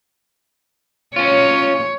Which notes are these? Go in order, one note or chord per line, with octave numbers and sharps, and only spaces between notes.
C#4 F4 C#5